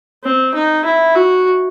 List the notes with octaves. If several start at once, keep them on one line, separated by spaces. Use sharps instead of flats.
C4
D#4
E4
F#4